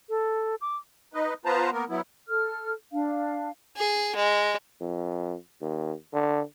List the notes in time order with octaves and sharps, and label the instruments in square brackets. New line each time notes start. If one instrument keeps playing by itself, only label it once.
[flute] A4
D6
[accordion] D#4 B4 D#5
B3 F4 B4 C5 A5 A#5
A#3 B3 A#4
F#3 B3 E4
[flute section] A4 F6
D4 F5
[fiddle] G#4
G#3
[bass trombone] F2
D#2
D3